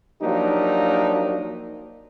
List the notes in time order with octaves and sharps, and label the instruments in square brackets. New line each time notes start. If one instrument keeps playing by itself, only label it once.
[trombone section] F3 F#3 A#3 D4 D#4 G4